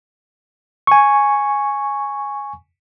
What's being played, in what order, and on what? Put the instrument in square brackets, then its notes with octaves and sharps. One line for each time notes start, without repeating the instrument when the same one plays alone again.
[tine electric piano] G#5 C#6